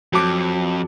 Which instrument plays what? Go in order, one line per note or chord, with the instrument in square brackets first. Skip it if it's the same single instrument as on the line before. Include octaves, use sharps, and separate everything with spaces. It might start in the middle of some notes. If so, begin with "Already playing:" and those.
[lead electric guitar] F2 [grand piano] F#3 A5 D6